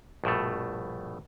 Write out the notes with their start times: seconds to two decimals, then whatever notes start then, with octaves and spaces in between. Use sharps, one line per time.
0.24 A#1 G2 B2 A3